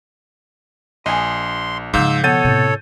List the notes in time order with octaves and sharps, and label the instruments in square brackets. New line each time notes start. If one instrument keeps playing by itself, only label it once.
[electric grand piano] A#1 [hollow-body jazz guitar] D#5 G#5 [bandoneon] C6
[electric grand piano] G#2 F5 G6 [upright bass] C#3 F3 [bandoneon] E6
[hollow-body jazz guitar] B2 F#5 [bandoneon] A4 C#5 [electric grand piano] G6 A6 D#7
[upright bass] A2 C3